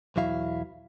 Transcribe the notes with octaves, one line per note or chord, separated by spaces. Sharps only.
B1 E2 F#3 E4 F5